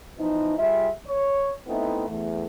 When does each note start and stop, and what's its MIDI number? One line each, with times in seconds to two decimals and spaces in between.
0.18 0.55 52
0.18 0.55 53
0.18 0.55 59
0.18 0.55 63
0.58 0.88 55
0.58 0.88 65
0.58 0.88 68
0.58 0.88 76
1.07 1.53 73
1.68 2.07 57
1.68 2.07 59
1.68 2.07 60
1.68 2.07 63
1.68 2.07 64
2.09 2.46 40
2.09 2.46 57